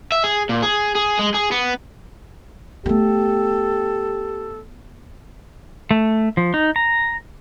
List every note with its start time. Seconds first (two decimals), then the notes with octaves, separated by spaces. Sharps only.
0.12 E5
0.24 G#4
0.49 A#2
0.63 G#4
0.95 G#4
1.19 G#3
1.34 G#4
1.52 B3
2.86 A3 B3 G4 A4
5.91 A3
6.37 F3
6.54 D#4
6.76 A#5